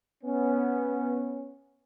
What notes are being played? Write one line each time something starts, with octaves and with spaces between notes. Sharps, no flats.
B3 C#4